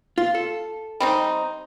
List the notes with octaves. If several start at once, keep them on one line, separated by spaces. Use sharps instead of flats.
F4
A4
G3 C4 D#4